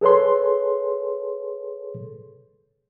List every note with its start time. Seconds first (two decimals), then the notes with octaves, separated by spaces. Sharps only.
0.01 G#4 A4 B4 C#5 C6